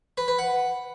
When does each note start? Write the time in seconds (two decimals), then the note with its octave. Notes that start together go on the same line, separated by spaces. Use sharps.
0.18 B4
0.28 B4
0.39 F#5